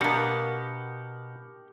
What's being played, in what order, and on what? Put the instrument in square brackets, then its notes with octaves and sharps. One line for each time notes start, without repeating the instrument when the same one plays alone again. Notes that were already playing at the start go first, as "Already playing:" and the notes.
[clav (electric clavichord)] B2 B3 [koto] A#3 D4 [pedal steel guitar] G4 A#4 F#5